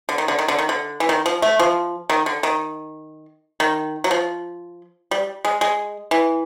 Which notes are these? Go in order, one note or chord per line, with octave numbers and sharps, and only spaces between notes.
D3
D#3
D3
D#3
D3
D#3
D3
E3
D#3
F3
A3
F3
D#3
D3
D#3
D#3
F#3
F3
G3
G#3
G#3
E3